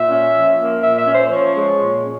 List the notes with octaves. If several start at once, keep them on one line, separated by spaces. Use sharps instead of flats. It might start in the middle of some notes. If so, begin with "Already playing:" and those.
Already playing: A#2 E5
C#4
F3
A#3
A#2 E5
E5
C#4
C5
F3 C#5
G#3
A#2
C#4